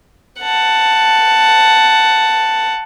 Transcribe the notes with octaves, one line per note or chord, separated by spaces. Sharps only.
F#5 A5